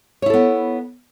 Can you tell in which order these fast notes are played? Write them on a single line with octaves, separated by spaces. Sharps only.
C#5 E4 A4 B3